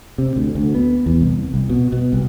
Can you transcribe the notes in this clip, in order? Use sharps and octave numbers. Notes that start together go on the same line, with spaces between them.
C3
D2
D2
B3
E2
C2
C2
B2
B2
C2